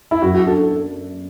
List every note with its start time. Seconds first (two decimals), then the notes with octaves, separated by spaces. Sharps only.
0.11 E4
0.22 F#2 F#4
0.35 F#4
0.46 D4 A4